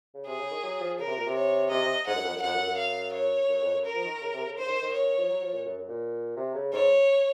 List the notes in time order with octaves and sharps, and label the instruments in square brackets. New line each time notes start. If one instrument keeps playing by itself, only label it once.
[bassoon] C#3
[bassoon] C3 [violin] G#4
[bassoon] C#3
D#3
F#3
F3
[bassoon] C#3 [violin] A#4
[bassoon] C3
A#2
C3
[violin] C#5
[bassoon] C3 [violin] D#5
[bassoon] C3
[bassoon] G#2 [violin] F#5
[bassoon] F#2
F2
F#2
[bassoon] F2 [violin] F#5
[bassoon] F#2
F#2
[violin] F5
C#5
[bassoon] F#2
F2
F#2
[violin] A#4
[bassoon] F3
D#3
C#3
C3
C#3
[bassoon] D#3 [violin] C5
[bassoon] C#3
D#3
D#3
[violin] C#5
[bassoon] F3
F#3
F3
A#2
F#2
F#2
A#2
C3
C#3
[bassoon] G#2 [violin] C#5